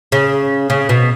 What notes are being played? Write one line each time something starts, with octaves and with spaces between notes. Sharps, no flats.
C#3
C#3
B2